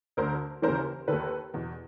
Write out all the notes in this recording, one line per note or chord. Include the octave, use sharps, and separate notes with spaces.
D2 D3 A#4 C5
D#2 C#3 E3 A#4 C5
D#2 D#3 A4 B4
E2 B2